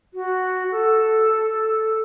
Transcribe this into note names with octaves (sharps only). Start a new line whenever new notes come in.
F#4
A4